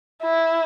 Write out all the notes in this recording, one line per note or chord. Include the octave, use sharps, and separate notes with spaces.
E4